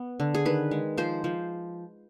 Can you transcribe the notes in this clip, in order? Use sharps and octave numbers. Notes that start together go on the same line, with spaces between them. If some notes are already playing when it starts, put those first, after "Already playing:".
Already playing: B3
D3
G#4
D#3 B4
G#3
F3 C5
F3